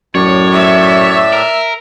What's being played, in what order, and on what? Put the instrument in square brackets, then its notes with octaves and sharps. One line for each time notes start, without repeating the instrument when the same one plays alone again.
[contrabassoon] F#2 [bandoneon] A2 D5 [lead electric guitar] C#5
[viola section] E5
[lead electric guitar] A#4